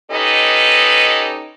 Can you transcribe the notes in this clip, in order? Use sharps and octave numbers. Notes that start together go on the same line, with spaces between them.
C#4 D#4 G4 A4 B4 D#5